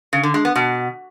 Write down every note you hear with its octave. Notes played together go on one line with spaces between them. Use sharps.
C#3
D3
G#3
B3
B2